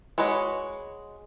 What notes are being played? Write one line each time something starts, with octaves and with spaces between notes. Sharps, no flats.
G#3 F#4 B4 C#5 D#5